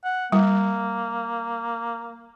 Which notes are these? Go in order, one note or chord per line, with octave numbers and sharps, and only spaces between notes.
F#5
G3 A#3